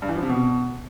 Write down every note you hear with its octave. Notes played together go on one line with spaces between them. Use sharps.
G2
E3
F3
C3
B2